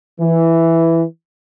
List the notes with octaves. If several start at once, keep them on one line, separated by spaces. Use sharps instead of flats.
E3